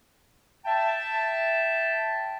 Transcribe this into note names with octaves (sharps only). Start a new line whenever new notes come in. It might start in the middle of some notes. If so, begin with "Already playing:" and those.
E5 G5 A5